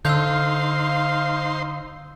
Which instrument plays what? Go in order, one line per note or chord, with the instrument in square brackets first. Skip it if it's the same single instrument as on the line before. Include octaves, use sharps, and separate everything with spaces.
[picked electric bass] D3 [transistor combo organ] D#4 C5 C6 [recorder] F5 [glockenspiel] E6 G6